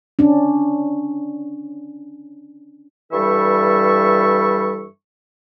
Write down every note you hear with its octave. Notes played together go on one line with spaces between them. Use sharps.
C#4 D4
G2 E3 G3 A4 E5 C#6